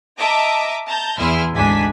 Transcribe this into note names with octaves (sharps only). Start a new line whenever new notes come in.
D#5 E5 A5 A#5 D6
A5 A#5 G6
E2 E4 G#4 E5 C6 F6
G#1 D2 G#2 D4 G#5 B6